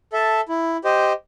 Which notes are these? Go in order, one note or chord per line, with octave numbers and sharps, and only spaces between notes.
A4 E5 A5
E4
G4 C5 D#5